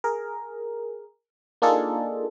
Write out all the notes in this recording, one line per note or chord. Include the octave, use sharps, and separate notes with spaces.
G#4 A#4
A#3 D4 D#4 F4 G#4 A4